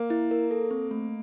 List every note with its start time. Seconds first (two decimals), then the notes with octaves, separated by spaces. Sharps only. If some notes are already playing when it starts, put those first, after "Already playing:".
Already playing: A#3
0.10 E4
0.31 A#4
0.51 A4
0.71 C4
0.91 A3